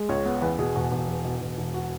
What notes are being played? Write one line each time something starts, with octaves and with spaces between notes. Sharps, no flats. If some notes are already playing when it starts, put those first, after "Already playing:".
Already playing: G#3
C#2 C#5
B3
E2 B4
B2 G#4
E1 F#4
E1
E2
B2
E1
E1
F#4